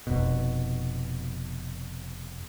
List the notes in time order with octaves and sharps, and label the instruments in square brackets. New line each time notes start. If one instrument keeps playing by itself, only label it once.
[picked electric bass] F1 B2